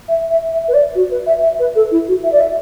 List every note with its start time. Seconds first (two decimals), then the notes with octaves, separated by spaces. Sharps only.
0.08 E5
0.30 E5
0.52 E5
0.68 B4
0.74 D5
0.95 F#4
1.11 B4
1.26 E5
1.43 E5
1.59 B4
1.75 A4
1.91 E4
2.08 F#4
2.23 E5
2.32 D5
2.40 E5